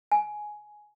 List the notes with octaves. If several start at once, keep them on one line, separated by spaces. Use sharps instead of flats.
G#5